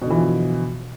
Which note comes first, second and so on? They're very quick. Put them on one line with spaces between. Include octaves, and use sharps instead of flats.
B2 D3 E3 F3